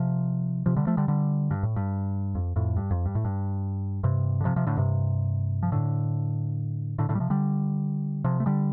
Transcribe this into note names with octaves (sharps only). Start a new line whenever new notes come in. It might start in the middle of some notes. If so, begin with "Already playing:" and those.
Already playing: C3 F3
C3 F3
D3 G3
F3 A3
D3 G3
D3 G3
G2
A2
G2
F2
F2 A2
G2
F2
G2
A2
G2
G2 C3
D3
C3 F3
C3 F3
A2 D3
G2 C3
F3
A2 D3
A2 D3
A2 D3
G3
C3 F3
D3 G3
C3 F3
A3
D3 G3